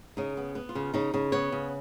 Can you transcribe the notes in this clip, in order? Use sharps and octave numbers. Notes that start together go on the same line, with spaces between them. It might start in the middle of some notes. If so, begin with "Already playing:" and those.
C#3 D#4
B3
B3
F4
C#3
C#3 D#4
C#3
B3 C#5
C#3